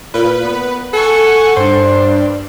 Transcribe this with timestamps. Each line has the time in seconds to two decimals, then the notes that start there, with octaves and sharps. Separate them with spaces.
0.14 A#2 B4
0.44 B3
0.93 A4 F#5 G#5 C#6
1.57 G2 D4 C5